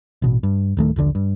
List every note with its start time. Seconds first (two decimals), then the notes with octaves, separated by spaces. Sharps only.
0.22 A1 B2
0.43 G2
0.77 D1 D#3 A3
0.96 D#1 A#1 D3 D4
1.15 G2